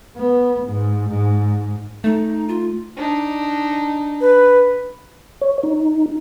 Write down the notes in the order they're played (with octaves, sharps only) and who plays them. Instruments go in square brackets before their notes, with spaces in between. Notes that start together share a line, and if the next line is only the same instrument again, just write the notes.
[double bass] B3
G#2
G#2
[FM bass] A3 [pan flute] D#4
[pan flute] F4
[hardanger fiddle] D4 D#4
[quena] B4
[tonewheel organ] C#5
D#4